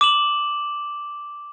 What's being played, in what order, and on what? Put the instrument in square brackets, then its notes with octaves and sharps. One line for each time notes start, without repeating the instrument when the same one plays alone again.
[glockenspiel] D6 E7 F#7